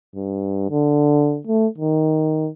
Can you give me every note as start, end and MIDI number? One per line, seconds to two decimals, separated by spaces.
0.15 0.69 43
0.70 1.39 50
1.47 1.67 57
1.78 2.49 51